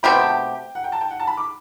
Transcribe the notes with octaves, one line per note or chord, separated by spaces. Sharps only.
B2 A3 C4 G4 B5
C6
A5
G5
F#5
G5
A5
G5
F#5
A5
B5
D6